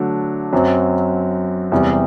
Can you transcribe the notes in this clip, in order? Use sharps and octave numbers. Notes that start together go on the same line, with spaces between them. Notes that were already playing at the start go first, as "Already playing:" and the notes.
Already playing: D3 F#3 A3 D4
F#2 F#3 C4
E2 C3 G3